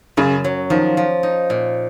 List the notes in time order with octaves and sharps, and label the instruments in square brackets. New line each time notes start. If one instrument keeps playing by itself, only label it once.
[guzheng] F#2 [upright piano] C#3
[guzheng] F#3
[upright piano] D#3 [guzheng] F3
[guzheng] F3
D#4
A#2